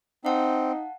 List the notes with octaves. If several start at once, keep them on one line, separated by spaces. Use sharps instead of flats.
C4 D#4 F5 F#5 A5